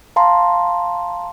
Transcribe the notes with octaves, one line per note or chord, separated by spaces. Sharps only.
F5 A5 A#5 C6